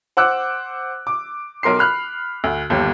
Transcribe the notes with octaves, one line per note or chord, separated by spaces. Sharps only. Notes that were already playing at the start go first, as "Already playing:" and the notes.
C5 F#5 D6 E6 F#6
D6
B1 A#4 C6 C7
B5 F6 F#6
D2
G1 D#2 G3